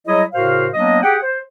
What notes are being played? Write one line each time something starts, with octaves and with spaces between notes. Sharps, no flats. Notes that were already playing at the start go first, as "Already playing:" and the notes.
F#3 G3 E4 G#4 C#5 D#5
A2 C#3 F#4 A#4 C5 F5
F#3 A#3 B3 D4 D#5
G4 G#4 F#5 G5
C5